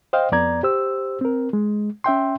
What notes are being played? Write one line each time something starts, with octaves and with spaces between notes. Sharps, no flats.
C5 D#5 F5 G5
F2 B3 D5 A#5 G#6
G4 C5 E6
C4 A#4
G#3
C#4 E5 G5 C6